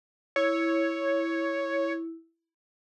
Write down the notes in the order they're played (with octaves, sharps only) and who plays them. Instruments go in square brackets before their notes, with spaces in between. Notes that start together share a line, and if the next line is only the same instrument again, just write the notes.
[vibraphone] E4 [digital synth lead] C#5